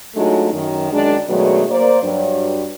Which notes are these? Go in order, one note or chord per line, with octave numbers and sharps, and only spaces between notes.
F#3 G#3 A3 D4 D#4 F4
F#2 D#3
F#2 D#3 G#3 D4
B2 D#3 F#3 G#3 A3 D4
A#3 C5 D5
G2 F#3 D4